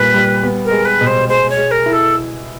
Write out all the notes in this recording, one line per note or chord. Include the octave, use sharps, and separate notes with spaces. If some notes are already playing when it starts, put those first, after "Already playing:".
Already playing: A#2 G3 B4
G3
B3
A#4
G#3
B4
B2
C5
G#3 C5
C#5
G#3
A#4
E4
A4